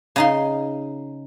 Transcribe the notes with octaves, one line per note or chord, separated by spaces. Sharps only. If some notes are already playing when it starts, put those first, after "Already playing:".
C#3 D#4 C6